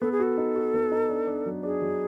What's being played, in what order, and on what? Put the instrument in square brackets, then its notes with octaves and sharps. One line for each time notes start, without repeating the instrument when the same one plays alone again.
[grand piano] B3 [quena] A4
[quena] G#4
[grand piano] F#4 [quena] A4
[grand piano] D#4
F#4
B3
D#4
D4
D4
F#3
[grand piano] D4 [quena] G#4
[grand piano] F#3